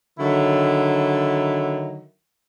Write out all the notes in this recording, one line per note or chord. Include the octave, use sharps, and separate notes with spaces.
D3 D#3 F#3 E4